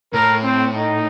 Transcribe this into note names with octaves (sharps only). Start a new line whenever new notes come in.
A2 A#4
C4
D#4